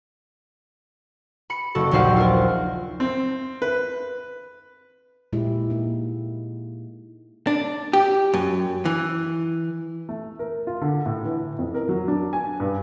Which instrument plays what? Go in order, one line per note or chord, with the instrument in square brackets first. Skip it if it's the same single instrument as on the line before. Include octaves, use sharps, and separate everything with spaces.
[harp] B5 C#7
F#1 F#4 A4
D#1 A#1 D#2 C5 F5 F#5
F4 A#4
[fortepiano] C4
B4
[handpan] A#2 G#3 E4 G4
A#3 D#4
[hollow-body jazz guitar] D4
G4
F#2
E3
[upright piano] A3
A#4
F4
D3
A2
E3
F2
A#4
F#3
D4
G#5
G2